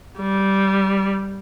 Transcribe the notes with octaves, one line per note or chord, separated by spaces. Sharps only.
G3